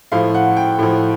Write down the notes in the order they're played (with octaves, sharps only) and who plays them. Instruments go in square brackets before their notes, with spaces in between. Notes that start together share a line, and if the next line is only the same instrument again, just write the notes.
[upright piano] A2 F3 F5
F#5
G5
A2 F3